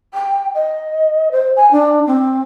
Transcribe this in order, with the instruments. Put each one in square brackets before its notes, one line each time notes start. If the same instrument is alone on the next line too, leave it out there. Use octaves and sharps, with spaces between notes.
[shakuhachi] G5
D#5
C5
G#5
D4
C4